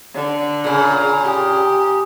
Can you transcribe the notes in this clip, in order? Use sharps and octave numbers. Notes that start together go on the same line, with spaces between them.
D3
A#2 C#3 G#4
G4 G#5 D#6